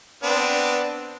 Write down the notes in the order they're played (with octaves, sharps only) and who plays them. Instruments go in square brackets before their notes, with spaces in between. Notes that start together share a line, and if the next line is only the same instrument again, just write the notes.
[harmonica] B3 C4 D4